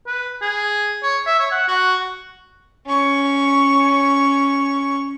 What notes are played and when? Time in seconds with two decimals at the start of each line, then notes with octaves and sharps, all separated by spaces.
0.07 B4
0.42 G#4
1.03 C#5
1.27 E5
1.40 C#5
1.52 F#5
1.68 F#4
2.86 C#4 C#6